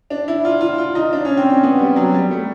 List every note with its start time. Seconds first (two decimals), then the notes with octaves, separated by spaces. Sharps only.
0.10 D4
0.28 E4
0.45 F4
0.61 F4
0.78 F4
0.95 D#4
1.13 D4
1.25 C#4
1.37 C4
1.50 C#4
1.63 B3
1.79 G3
1.96 F#3
2.14 G3
2.31 A3